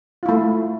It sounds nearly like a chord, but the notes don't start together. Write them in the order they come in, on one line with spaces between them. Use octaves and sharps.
F4 E4 A3